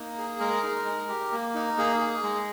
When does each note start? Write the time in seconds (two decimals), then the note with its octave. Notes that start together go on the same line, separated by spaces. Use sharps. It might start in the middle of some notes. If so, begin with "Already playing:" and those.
Already playing: A#3 D#4
0.18 G#4
0.40 G#3 A#4
0.63 D#4
0.86 G#3
1.09 G4
1.32 A#3
1.55 D#4
1.78 A#3 G#4
2.00 G#4
2.23 G#3